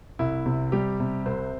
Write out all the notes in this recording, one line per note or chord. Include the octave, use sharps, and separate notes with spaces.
C2 E4
C3
G3 G4
C3
C2 C5